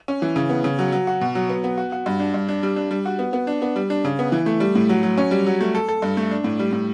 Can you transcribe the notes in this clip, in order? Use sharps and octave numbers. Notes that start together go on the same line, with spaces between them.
C#4
E3
C#3
B3
C#3
F#3
F#3
F#4
B2
F#3
B3
B3
F#4
F#4
G2
D4
G2
D4
G3
D4
G3
F#4
B3
B3
D4
B3
G3
D4
C#3
B3
E3
A3
G3
A2
F#3
F#3
C#4
G3
F#3
A3
A4
A4
G2
A3
D4
A2
G3
A2